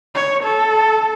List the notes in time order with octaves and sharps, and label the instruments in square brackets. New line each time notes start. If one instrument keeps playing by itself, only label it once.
[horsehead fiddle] C#5
A4